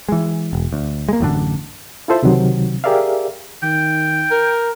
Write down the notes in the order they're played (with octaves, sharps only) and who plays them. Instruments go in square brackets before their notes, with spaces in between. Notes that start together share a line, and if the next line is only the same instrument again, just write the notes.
[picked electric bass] E3 G#3
E1
D2
G#3 A#3
A1 F#2 D3 D4
[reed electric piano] E4 F4 A4 C5 E5
C#2 C3 D#3 F#3
G4 G#4 A#4 D5 E5 F5
[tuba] D#3 [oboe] G5
[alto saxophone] A#4